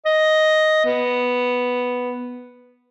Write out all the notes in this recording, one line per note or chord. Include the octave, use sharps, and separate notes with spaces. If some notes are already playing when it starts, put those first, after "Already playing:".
D#5
B3